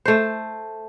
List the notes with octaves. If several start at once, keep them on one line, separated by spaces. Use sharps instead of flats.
A3 C5